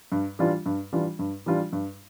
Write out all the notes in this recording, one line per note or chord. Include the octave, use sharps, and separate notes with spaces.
G2
E3 G3 D4 F4
G2
E3 G3 D4 F4
G2
E3 G3 D4 F4
G2